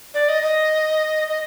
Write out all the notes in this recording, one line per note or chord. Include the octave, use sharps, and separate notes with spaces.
D5
D#5
D#5
D#5